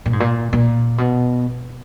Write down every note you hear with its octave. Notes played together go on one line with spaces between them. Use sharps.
A#2
G#2
A#2
A#2
B2